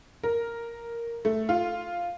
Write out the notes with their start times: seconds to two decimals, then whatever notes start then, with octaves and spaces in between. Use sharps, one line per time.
0.23 A#4
1.25 A3
1.49 F4